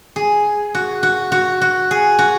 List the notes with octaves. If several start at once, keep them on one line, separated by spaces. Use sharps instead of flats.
G#4
F#4
F#4
F#4
F#4
G#4
F#4